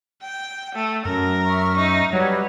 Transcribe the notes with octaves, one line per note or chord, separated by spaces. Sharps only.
G5
A3
F#2 A#4
E5 C#6 F6
D#4
F#3 G3 B4 C#5